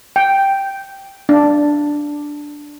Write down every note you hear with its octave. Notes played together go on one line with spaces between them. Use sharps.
G5
D4